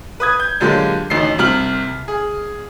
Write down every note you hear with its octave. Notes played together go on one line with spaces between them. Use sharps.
B4 D#6 G#6
G6
A#2 D3 F#3 G#3 A#3 G4
A1 D2 D#4 C7
C2 C3 F6 F#7
G#4